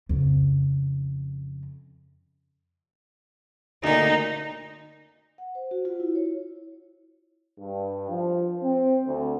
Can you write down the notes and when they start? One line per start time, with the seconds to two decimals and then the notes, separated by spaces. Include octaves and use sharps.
0.09 F2 C#3
3.84 D2 A#2 D#4
5.38 F#5
5.55 C5
5.71 F#4
5.85 F4
6.00 E4
6.15 C#5
7.60 G2
8.09 F3
8.63 C4
9.06 D2